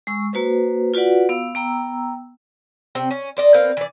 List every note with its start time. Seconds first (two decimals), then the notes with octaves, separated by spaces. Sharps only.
0.07 G#3 C#6 E6
0.33 A#3 F#4 B4 C5
0.94 F4 F#4 B4 D5 F#5
1.29 B3 F5 E6
1.55 B3 G5 A#5 E6
2.95 C3 C4 G5
3.11 C#4
3.37 C5 D5 D#5
3.54 B3 C4 A#4 F5
3.77 E3 D5